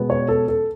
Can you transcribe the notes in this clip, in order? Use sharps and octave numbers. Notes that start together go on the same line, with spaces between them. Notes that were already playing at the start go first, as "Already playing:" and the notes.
Already playing: B2 G#3 B3
C#5
A4
A4